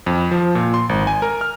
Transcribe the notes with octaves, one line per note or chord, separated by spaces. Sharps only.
F2
F3
A#2
C6
G#1
G#5
A#4
F6